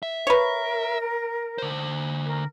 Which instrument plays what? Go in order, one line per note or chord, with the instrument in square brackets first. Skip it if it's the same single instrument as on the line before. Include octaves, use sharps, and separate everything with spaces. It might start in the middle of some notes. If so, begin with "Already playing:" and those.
[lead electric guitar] E5
[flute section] A#4 [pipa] B4 C#5
[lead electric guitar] D3 C5
[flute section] A#4